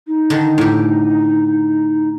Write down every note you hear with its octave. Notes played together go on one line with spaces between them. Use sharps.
D#4
D3 D#3
A2 G4